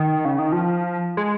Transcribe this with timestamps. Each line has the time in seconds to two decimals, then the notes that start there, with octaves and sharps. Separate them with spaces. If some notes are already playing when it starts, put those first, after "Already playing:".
Already playing: D#3
0.25 C#3
0.39 D#3
0.52 F3
1.17 G#3